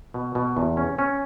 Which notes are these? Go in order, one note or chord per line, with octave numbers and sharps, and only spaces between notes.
B2
B2
E2
C#4
C#4